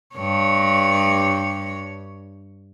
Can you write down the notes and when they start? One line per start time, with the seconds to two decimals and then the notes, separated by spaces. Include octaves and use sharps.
0.16 G2 C#5